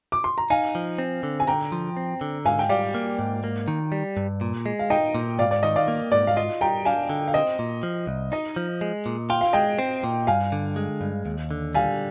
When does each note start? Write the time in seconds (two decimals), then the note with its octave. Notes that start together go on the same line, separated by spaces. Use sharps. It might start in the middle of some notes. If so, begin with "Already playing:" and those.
0.12 D6
0.24 C6
0.38 A#5
0.50 D#4 F5 G#5
0.75 F3
0.98 C4
1.23 D3
1.40 G#5
1.47 D3 G5 A#5
1.72 F3
1.97 C4
2.21 D3
2.45 G#2 F5 G#5
2.59 G5
2.69 G3 D5 F5
2.94 A#3
3.19 G#2
3.44 A#3
3.68 D#3
3.92 G3
4.17 G2
4.41 A#2
4.66 G#3
4.79 F5
4.90 D#4 D#5 G5
5.15 A#2
5.39 G#2 D5 F5
5.51 D5
5.63 D#3 D#5
5.76 D5 F5
5.88 A#3
6.12 G#2 D5
6.27 F5
6.37 F4 D#5
6.61 G3 G5 A#5
6.85 D4 F5 G#5
7.09 D3
7.28 F5
7.34 C4 D#5
7.59 A#2
7.83 F3
8.07 C2
8.32 D#4 D#5
8.56 F3
8.81 G#3
9.06 A#2
9.30 F4 G5
9.41 F5
9.53 G#3 D#5 G5
9.79 C4
10.04 A#2
10.27 G2 F5 G#5
10.52 D3
10.76 G#3
11.01 G2
11.26 D#2
11.51 D3
11.75 G3 F5 G#5